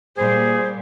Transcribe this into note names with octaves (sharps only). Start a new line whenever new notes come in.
A#2 G3 G#4 C5